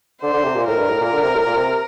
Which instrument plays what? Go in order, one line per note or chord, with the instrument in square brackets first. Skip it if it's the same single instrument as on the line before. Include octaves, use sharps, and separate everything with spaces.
[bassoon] D3 [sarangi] C5
[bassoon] D3
C3
A#2
[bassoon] A2 [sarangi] A#4
[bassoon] G2
A2
A#2
D3
C3
A2
A#2
C3